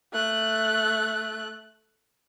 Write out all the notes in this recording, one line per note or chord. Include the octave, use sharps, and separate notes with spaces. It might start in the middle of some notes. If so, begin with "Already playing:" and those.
A3 F#6